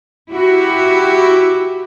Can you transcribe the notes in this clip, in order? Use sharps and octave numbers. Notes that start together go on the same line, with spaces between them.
E4 F#4 G4